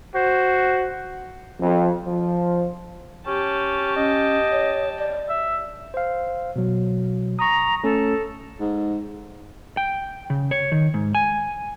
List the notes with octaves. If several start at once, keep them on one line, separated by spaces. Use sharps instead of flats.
F#4 C5
F2
F3
C#4 G4 A5
C#4 D#5
C#5
D5
E5
C5 F5
B2 F#3
A#5 C#6 D#6
A3 C#4 A4
G#2
G5
C#3
C#5
D#3
G#2
G#5